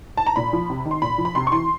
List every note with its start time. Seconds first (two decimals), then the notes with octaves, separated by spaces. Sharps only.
0.17 A5
0.27 A#5
0.36 A#2 B5
0.53 F3
0.70 C3
0.85 D#3
0.91 C6
1.02 A#2 B5
1.18 F3
1.25 B5
1.35 C3 C6
1.47 C#6
1.52 E3 C6